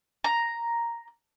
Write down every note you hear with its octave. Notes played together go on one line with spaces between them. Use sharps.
A#5